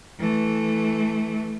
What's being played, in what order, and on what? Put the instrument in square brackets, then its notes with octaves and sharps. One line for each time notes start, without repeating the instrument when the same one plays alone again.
[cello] E3 A3